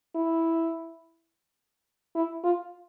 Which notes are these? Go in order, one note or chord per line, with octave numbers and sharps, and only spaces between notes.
E4
E4
F4